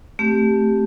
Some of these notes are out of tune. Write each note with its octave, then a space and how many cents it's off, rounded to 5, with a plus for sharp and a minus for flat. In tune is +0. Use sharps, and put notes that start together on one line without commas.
A3 +0 C4 +0 G4 +0